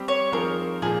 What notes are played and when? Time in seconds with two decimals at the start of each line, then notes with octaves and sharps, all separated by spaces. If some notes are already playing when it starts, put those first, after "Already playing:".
Already playing: G3 C4 G4
0.08 C#5
0.32 F3 C4 D#4 G#4 A#4
0.82 A#2 F3 A#3 G#4